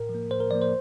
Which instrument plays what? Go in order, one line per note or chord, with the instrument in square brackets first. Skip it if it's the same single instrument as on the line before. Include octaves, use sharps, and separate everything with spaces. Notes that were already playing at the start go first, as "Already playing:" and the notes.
Already playing: [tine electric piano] A2 A#4
F3
A#3
A2 C5
A#4
F3 A#3 D5
C5